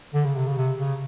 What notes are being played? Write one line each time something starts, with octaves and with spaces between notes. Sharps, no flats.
D3
C#3
C3
C#3
C3
C#3